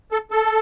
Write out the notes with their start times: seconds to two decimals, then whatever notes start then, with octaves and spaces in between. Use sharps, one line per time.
0.12 A4
0.31 A4